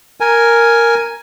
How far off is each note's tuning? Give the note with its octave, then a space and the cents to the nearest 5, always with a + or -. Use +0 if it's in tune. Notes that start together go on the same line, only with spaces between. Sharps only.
A#4 +0 G#5 +0